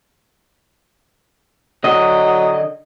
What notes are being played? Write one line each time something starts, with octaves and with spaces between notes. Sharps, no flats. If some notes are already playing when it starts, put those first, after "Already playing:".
D3 F#3 D#5